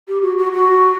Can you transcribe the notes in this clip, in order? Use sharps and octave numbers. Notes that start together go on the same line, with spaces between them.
G4
F#4
F#4
F#4